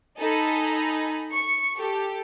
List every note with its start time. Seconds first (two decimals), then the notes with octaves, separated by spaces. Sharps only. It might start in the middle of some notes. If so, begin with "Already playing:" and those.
0.20 D#4 A4 D#5 G#5 A#5 B5
1.33 C#6
1.78 G4 A4